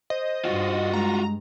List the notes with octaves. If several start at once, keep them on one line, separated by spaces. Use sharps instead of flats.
C5 D#5
G2 F4 F#4
G#3 A#5